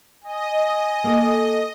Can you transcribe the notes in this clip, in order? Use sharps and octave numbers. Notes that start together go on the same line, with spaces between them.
D#5 G#5
A#3 A4